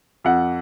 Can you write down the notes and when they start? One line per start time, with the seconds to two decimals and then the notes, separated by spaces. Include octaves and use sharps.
0.24 F2 F#5